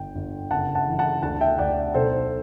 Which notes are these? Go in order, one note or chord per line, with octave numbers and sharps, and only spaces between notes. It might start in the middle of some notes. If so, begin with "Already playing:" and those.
Already playing: G1 G5
G1
F#1 F#5 A5
F#5 A5
E3
F#5 A5
D2 F#5 A5
E5 G5
D2 D5 F#5
B1 A4 C5